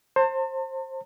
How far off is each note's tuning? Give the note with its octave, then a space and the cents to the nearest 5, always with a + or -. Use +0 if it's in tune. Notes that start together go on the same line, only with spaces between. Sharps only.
C5 +20 A5 +45